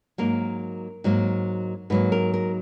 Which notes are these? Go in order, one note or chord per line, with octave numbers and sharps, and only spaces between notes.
G#2 F#3 A#3 A#4
G#2 F#3 A#3
G#2 F#3 A#3 B4
A#4
A#4